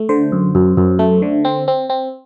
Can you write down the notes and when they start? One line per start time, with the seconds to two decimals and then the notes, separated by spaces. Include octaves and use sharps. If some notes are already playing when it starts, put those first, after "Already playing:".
Already playing: A3
0.09 D3 C5
0.32 F#2
0.55 F#2
0.77 F#2
0.99 A3
1.22 D3
1.45 C4
1.68 C4
1.90 C4